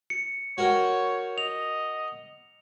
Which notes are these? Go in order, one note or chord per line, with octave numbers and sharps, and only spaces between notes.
C#7
F#4 A#4 C#5 G5
D#5 F7